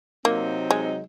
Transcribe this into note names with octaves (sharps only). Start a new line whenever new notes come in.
C3 F#3 A#3 C4 D#4
G#3